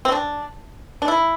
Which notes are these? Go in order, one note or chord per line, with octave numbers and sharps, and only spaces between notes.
C4
D4
D4
E4